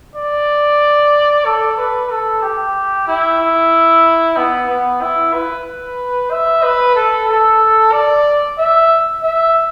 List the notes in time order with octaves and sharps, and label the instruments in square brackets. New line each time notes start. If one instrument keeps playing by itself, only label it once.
[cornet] D5
A4
B4
A4
G4
E4
E4
B3
B3
E4
B4
E5
B4
A4
A4
D5
E5
E5